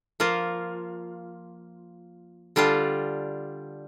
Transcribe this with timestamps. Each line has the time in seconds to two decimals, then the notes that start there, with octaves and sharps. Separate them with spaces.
0.20 F3 A#3 F4
2.56 D3 G3 D4 F4